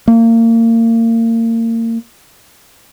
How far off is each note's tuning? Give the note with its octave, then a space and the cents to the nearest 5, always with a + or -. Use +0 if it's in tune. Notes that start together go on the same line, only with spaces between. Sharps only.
A#3 -35